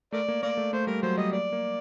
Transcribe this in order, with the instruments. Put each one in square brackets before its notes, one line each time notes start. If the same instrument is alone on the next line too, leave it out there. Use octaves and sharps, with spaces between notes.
[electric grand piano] A3 [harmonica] A#4 D5
[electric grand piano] A#3
[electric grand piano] A#3 [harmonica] A#4 D5
[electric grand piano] A3
[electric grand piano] A3 [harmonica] C5
[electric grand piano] G3 [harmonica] A#4
[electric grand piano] F#3 [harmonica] C5
[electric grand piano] G3 [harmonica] D#5
[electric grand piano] A#3 [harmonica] D5
[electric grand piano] A#3